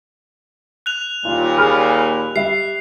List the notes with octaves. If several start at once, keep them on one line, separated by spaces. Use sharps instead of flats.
F#6 F7
D#2 A#2 G3 F4
G#4 B5 F6
G3 E5 C7